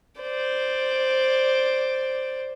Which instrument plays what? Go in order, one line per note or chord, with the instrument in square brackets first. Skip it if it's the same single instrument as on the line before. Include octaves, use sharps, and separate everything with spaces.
[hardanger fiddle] C5 D5